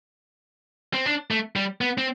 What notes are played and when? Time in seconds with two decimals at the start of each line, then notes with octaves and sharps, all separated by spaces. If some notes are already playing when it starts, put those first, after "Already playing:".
0.94 C4
1.06 D4
1.31 A3
1.56 G3
1.81 B3
1.98 C4